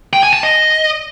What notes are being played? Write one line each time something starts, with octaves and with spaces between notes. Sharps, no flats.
G5
G#5
A5
D#5